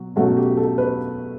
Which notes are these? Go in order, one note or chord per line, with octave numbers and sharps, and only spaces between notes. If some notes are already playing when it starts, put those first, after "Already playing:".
Already playing: B2 F#3 F#4
B2 F#3 A3 C#4 F#4
G4
A4
B4